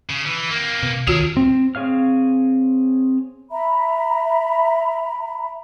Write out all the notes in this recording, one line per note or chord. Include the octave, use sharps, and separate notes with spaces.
C#3
E3
A#3 C4
B2
C#2 D#3 F4 F#4 G#4 A#4
C4
C4 G#4 C#5 F5 F6
E5 A#5 B5